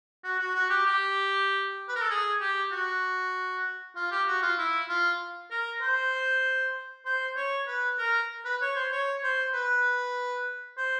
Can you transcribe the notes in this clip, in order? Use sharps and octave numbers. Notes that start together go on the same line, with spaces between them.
F#4
F#4
F#4
G4
G4
B4
A#4
A4
G#4
G4
F#4
F4
G4
F#4
F4
E4
F4
A#4
C5
C5
C#5
B4
A#4
B4
C#5
C5
C#5
C5
B4
C5